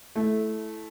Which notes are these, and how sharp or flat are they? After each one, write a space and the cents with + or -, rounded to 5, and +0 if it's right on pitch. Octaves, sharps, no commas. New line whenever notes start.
A3 -15 E4 +0